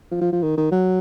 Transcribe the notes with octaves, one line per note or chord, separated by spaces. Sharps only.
F3
F3
F3
D#3
D#3
F#3